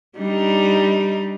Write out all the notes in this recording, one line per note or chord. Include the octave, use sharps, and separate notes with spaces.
G3 D4 D#4